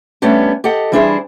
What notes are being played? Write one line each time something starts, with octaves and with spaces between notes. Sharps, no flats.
G3 A3 B3 C#4 D4 G4
G4 A4 D#5 F#5
E3 G3 D4 E4 G#4 C5